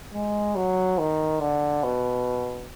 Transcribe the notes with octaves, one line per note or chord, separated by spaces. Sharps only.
G#3
F#3
D#3
D3
B2